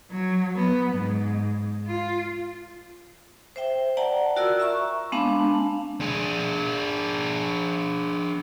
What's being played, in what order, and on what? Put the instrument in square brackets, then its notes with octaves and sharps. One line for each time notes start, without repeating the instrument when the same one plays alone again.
[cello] F#3
B3
G#2
F4
[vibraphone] C5 E5 G5
D5 F#5 G5 A5 A#5
F4 F#4 A#4 D5 E6
E5 A#5 C#6
G#3 B3 C4 D4 F5 A5
[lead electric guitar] D4 G#4